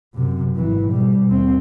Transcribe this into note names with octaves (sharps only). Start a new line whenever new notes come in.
F#2 C3
G#1 E3
B2 G3
D#2 C4